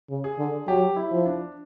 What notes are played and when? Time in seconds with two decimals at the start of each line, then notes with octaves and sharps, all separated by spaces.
0.09 C#3
0.24 G#4
0.38 D3
0.67 F#3 G4
0.96 E4
1.11 F3
1.26 D4